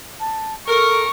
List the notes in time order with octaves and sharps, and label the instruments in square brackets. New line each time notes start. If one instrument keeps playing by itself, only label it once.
[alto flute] A5
[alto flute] A4 [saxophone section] A#4 [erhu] C#6